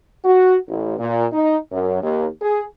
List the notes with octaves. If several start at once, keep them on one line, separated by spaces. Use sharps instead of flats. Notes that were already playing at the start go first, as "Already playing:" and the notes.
F#4
A1
A#2
D#4
F#2
D#2
G#4